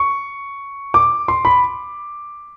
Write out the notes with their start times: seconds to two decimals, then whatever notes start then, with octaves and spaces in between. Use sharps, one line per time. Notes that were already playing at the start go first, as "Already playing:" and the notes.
Already playing: C#6
0.94 D6
1.28 C6
1.45 B5